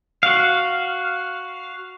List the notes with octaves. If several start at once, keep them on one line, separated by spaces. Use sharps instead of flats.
F#4 F5